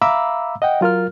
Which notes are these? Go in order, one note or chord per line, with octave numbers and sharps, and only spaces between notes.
E5 F5 A#5 B5 D6 E6
D#5 F#5 G5
F#3 F4 A#4 F6